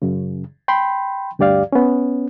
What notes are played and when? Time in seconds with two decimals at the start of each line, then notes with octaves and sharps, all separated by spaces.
0.02 F#2 C#3
0.68 G5 B5 C6
1.39 D2 G2 G4 D5 F5
1.72 B3 C#4